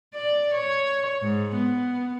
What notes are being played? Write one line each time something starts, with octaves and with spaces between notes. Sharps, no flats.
D5
C#5
G#2
B3